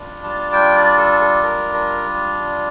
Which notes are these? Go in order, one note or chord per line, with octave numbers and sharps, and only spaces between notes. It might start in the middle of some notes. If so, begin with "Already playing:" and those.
Already playing: G3 D4 F4
A5
G5
D5
A4
A4
A#4
A#4